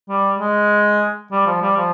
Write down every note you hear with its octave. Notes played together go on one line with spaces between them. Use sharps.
G3
G#3
G3
F3
G3
F3